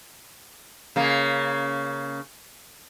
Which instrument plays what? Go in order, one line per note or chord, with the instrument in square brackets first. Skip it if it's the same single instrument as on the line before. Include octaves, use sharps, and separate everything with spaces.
[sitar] C#3 A#3